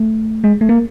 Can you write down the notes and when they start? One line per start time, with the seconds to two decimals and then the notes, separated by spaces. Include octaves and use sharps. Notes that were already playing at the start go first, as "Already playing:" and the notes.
Already playing: A3
0.44 G#3
0.61 A3
0.69 A#3